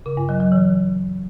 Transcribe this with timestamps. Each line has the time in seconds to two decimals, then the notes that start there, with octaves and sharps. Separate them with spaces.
0.06 C#3
0.17 G2
0.29 F#3
0.40 F#3
0.52 E3